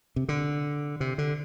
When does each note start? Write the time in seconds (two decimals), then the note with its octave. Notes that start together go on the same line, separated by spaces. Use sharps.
0.16 C3
0.29 D3
1.00 C3
1.18 D3